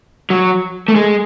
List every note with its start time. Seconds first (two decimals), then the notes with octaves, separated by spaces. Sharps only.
0.30 F#3
0.88 A3
0.95 G#3